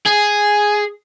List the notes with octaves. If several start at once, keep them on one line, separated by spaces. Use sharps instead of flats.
G#4 G#5